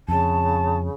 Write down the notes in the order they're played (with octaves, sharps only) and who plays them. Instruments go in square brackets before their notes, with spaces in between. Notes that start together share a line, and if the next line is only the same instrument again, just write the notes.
[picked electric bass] F2 [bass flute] C#3 [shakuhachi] A5